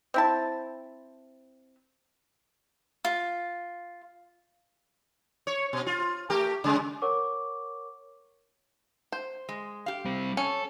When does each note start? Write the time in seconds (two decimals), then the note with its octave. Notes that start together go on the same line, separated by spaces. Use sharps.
0.14 C4 E4 A5
3.05 F4
5.47 C#5
5.73 B2
5.86 F4
6.30 A3 G4 A#4
6.64 C#3 G#3
7.02 A#4 C#5 F#5 C#6 D6
9.12 C5
9.49 G#3
9.86 G4 F5
10.05 G3 C4
10.37 C#4 A4